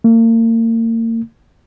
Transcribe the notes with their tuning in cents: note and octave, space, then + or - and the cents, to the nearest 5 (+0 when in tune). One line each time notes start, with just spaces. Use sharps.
A#3 -40